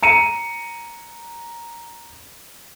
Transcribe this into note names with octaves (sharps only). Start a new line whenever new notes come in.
A#5 C#7 D#7